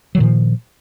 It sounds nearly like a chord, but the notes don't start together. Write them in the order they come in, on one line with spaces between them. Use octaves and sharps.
F#3 D#3 A#2 F3